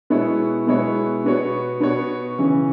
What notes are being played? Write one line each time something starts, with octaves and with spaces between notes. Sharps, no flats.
B2 G#3 B3 E4 C#5
B2 G#3 B3 E4 C#5
B2 B3 F#4 C#5
B2 B3 F#4 C#5
C#3 E3 C#4